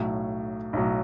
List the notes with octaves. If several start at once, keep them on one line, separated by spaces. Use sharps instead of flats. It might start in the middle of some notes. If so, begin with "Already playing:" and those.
Already playing: B1 A2 F#3
B1 A2 F#3